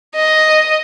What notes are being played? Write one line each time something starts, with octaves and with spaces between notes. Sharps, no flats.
D#5